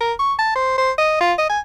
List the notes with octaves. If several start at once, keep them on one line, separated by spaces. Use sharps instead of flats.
A#4
C#6
A5
C5
C5
D#5
F4
D#5
G#5